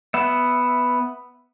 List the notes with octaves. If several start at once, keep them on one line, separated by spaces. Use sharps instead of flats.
B3 E5